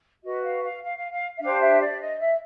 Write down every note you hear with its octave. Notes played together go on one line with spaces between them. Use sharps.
F#4 B4 D#5
F5
F5
F5
F5
F5
E5
D4 G4 C5 F5
E5
D5
D#5
E5